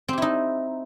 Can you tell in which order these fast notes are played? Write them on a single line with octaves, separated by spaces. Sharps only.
C4 G4 E4 D#4